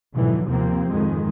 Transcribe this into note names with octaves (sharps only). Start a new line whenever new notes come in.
F2 G#2 B2 D3 E3 F#3
D#2 C3 F3 A#3 C4
F2 G#2 D#3 G#3